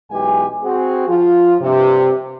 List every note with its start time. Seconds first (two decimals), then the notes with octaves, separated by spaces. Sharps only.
0.11 B1 E3 G#3 G4 G#5
0.63 C4 F#4 G#4
1.08 F3 F4
1.61 G2 C3